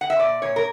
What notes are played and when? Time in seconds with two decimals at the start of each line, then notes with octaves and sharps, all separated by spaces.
0.01 F#5
0.10 E5
0.19 A#2 D5
0.42 A#2 C#5
0.56 A#4